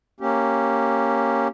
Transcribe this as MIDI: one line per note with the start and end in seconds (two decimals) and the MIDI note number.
0.21 1.48 58
0.21 1.48 61
0.21 1.48 67